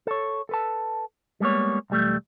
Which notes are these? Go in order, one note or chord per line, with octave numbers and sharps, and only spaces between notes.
A4 C#5
A4 B4 A5
G3 G#3 A#3 B3 C#5
B1 E2 G3 A3